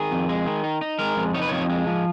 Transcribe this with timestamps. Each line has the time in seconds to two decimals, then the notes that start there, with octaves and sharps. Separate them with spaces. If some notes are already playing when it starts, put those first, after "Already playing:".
Already playing: D#3 G#4
0.11 F2
0.29 G#3
0.46 D#3
0.64 D#4
0.81 D#4
0.99 G#3 A#4
1.17 F2
1.34 D#4 C#5
1.42 B4
1.49 F2 C#5
1.70 G#3
1.87 F3